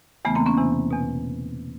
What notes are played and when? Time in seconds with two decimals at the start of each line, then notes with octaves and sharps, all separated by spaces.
0.25 E2 C#3 E3 A3 B3
0.35 A#3 C4
0.46 B3 C#4
0.57 E2 C3 E3
0.91 E2 B2